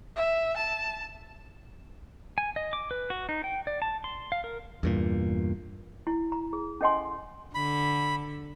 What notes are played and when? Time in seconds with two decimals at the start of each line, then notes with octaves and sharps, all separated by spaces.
0.16 E5
0.57 A5
2.38 G#5
2.56 D#5
2.73 D6
2.91 B4
3.10 F#4
3.29 D#4
3.44 G5
3.67 D5
3.82 A5
4.04 C6
4.32 F5
4.44 A#4
4.83 E2 G2 A#2
6.07 E4
6.32 A#5
6.53 G#4
6.81 C#4 A4 D#5 F#5 G#5 C6
7.55 D3 B5